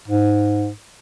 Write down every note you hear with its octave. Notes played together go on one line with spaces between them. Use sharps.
G#2